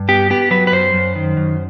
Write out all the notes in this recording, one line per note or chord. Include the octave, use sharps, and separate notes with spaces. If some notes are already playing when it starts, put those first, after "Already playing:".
Already playing: G2
B3 G4
B3 G4
F#3 B4
B4
F#2 C5
F#2
D#3
F#2